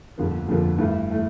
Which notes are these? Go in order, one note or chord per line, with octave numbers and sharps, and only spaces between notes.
G1 F2 D3 F3 A#3
G1 F2 D3 F3 A#3
G2 E3 A3
E3 A3